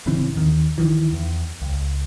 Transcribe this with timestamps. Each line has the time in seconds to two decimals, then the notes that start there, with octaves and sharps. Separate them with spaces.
0.06 D1 C#3 E3 C4
0.36 D#2 D#3
0.78 D2 D#3 E3
1.13 E2
1.62 C#2